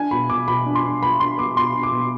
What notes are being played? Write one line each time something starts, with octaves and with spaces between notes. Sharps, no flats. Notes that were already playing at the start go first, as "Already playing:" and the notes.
Already playing: D4 G#5
B2 B5
B2 D6
B2 B5
D4
C6
D4
B3 B5
D4 C6
B3 D6
B2 C6
D4
D6
B2